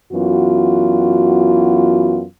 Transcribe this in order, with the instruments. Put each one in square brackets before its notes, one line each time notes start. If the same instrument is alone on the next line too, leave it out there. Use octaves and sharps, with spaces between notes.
[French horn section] F#2 E3 B3 F4 F#4